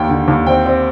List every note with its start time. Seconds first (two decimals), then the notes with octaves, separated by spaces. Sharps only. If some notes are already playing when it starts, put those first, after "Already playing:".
Already playing: D#2 G5
0.09 D3
0.28 D#2
0.47 C4 G5
0.66 C4